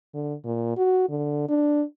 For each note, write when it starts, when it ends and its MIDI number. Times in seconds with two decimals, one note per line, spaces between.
0.14 0.34 50
0.44 0.74 46
0.77 1.07 66
1.09 1.46 50
1.49 1.83 62